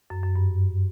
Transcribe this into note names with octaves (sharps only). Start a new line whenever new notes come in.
F#2
F#2
G2